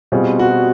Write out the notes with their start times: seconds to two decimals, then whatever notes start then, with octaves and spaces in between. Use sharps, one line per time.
0.12 B2 G3 C4 F4 G#4
0.39 F#4